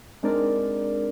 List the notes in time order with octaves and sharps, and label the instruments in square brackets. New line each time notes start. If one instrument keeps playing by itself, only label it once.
[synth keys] G#3 C4 D4 D#4 A#4 D5